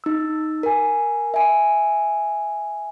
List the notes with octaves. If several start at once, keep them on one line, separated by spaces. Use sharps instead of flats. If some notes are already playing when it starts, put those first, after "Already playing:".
D#4 E6
A#4 G#5
E5 G#5